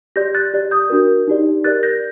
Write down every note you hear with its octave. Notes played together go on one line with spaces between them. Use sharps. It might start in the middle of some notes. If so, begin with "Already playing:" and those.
G4 D5 G6 A#6
F#6 A6
G4 D5
D#6 G6
D4 F#4 A#4
D#4 G4 D5
G4 A#4 D5 F#6 A6
G6 A#6